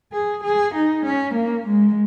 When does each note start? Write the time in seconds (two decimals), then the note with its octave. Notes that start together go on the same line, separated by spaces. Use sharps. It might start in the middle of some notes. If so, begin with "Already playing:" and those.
0.12 G#4
0.43 G#4
0.73 D#4
1.04 C#4
1.35 A#3
1.65 G#3